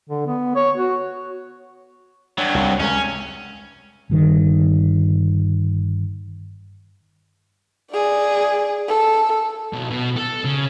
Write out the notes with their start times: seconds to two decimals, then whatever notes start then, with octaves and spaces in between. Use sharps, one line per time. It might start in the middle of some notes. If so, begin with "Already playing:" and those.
0.10 D3
0.27 B3
0.56 C#5
0.77 F#4
2.38 G2 F#3
2.55 C2
2.80 C#2 C3 C#4
4.10 G1 G2 D#3
7.91 G#4 D5
8.88 A4
9.73 B1
9.90 B2
10.16 A4
10.44 C#3